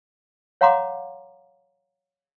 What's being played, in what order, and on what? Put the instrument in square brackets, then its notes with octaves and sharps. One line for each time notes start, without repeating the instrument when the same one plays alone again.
[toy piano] C#5 F5 F#5 A#5 C6 D6